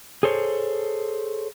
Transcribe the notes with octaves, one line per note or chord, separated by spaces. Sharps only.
G#4 A4 C5 C#5